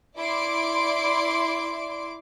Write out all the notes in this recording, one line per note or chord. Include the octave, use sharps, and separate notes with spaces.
E4 D5 C6 D6 D7